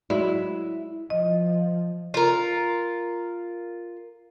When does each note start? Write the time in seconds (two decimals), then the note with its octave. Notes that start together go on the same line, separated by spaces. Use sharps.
0.10 F#3 G#3 E4 F#4 D5
1.10 F3 D#5
2.14 F4 A#4